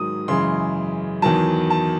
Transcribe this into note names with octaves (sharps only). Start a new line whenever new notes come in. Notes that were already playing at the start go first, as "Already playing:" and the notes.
Already playing: G#2 D#3 F#3 D#6
F#2 C#3 E3 G#3 C6
E2 D#3 F#3 A5
A5